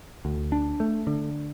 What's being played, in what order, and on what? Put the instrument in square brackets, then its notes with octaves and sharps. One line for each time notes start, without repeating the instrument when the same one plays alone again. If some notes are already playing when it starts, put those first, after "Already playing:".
[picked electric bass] D2
D4
A3
D3